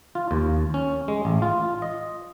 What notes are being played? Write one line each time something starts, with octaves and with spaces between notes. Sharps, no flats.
F4
D#2
C#4
G#3
A1
F4
D#5